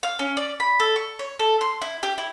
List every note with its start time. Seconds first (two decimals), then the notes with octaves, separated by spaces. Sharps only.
0.03 F5
0.19 C#4
0.37 D5
0.60 B5
0.80 A4
0.96 C#6
1.19 C#5
1.39 A4
1.61 C6
1.82 E4
2.03 G4
2.18 E4